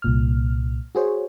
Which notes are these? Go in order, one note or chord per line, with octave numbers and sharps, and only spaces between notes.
C2 A#2 F6
F#4 G#4 C5 C#5